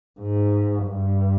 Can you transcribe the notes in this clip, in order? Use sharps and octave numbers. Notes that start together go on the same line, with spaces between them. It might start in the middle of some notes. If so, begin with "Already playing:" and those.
G#2
G2